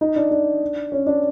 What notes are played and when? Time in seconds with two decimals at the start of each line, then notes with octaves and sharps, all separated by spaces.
0.01 D#4
0.16 D4
0.31 D4
0.92 C#4
1.07 D4